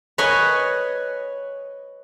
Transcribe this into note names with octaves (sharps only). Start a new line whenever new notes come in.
B4 C#5 D#5 G#5